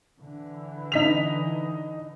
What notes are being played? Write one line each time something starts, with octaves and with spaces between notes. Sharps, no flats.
D3 E3
D#4 B6 F7